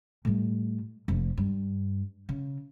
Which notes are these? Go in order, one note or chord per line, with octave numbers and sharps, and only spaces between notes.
A2 G3
F1 F2
G2
C#3